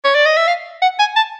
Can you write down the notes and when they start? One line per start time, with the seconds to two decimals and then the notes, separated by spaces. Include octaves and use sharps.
0.04 C#5
0.15 D5
0.26 D#5
0.37 E5
0.47 F5
0.82 F#5
0.99 G#5
1.16 A5